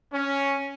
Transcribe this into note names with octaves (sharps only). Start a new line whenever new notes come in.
C#4